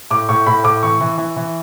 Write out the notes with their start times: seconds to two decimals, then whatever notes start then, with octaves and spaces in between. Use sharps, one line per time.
0.11 A2 D6
0.29 A2 C#6
0.46 A2 B5
0.64 A2 D6
0.83 E3 C#6
1.00 E3
1.18 E3
1.36 E3